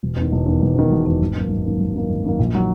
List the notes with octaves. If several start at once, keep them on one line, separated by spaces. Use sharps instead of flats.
E1
E2
D#3
E1
E2 D#3
E1
E2 D#3
E1
E2 D#3
G#1
F#2 D#3 A#3
G#1
F#2 D#3 A#3
G#1
F#2 D#3 A#3
G#1
F#2 D#3 A#3
A#1
D#3 F#3